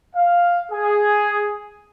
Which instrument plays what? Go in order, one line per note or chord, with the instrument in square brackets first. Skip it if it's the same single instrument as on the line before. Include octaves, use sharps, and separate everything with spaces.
[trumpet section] F5
G#4